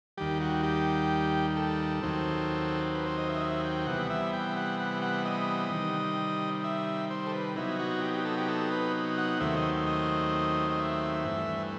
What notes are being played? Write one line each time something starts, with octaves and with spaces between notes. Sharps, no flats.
D#2 D#3 G3 G4
F#4
G4
A4
D#2 D#3 F#3 C4
B4
C5
D#5
E5
D#5
E5
G5
C3 E3 G3 B3 F#5
E5
G5
F#5
F#5
F#5
D#5
C3 D#3 G3
E5
C5
A4
B4
C3 F#3 B3 D#4 E4
F#4
G4
G4
A4
G4
A4
B4
F#5
D#2 D#3 F#3 A3 C4 E5
D#5
D#5
D#5
E5
G2 E3 A3